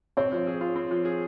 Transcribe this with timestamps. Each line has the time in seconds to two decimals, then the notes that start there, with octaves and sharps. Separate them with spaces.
0.17 C4 C#5
0.32 F3
0.47 G#4
0.61 F4
0.76 C4
0.91 F3
1.05 G#4